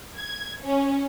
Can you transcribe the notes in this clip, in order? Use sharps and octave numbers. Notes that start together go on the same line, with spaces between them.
G#6
C#4